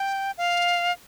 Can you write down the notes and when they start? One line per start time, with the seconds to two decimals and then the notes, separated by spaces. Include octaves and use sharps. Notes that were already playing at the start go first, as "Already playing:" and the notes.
Already playing: G5
0.38 F5